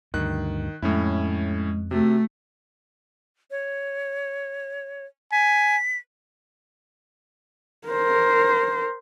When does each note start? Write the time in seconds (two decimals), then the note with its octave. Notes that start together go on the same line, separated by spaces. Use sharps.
0.14 D2 G2 D#3 F#6
0.82 F2 A2 G#3 C#4 E4
1.91 C3 A3 F#4
3.51 C#5
5.32 G#5 B6
7.88 A#4 C5